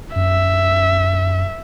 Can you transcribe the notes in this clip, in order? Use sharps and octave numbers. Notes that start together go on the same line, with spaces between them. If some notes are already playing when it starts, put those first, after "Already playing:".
F#2 E5